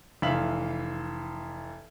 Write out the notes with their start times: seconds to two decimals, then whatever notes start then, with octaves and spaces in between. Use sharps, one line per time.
0.22 F1 E3 E5 F5 F#7